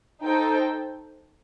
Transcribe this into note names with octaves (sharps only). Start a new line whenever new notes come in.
D#4 A4 C5 G5